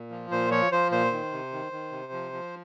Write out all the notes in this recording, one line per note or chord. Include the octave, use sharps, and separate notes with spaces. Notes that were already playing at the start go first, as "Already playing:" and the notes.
Already playing: A#2
F3
A#2 C5
F3 C#5
F3 C5
A#2 C5
D#3
C3
D#3
D#3
C3
F3
F3